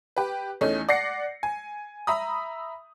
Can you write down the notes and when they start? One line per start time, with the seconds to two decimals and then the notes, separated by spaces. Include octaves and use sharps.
0.17 G4 B4
0.61 E2 A3 C#4 D#4
0.89 D5 F#5 A#6 C7 C#7
1.43 G#5
2.07 E5 A#5 B5 D#6